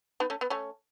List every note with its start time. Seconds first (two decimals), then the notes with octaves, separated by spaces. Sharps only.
0.20 B3 D#4
0.30 A3 C#4
0.41 B3
0.50 A3 C#4